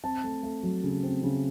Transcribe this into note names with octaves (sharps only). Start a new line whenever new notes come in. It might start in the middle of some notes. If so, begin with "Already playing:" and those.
C4 A5
A3
A3
F#3
C#3
C4
C#3